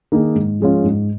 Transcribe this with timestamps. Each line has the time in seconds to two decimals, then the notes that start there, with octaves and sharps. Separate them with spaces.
0.12 D#3 A#3 D#4 G#4
0.35 G#2
0.60 F3 G#3 C#4 F4
0.84 G#2